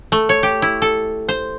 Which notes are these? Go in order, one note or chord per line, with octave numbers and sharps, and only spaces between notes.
A3
C#5
G4
E4
A4
C5